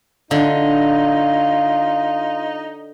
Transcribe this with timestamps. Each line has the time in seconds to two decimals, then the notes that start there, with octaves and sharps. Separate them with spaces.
0.31 D3 D#4 F4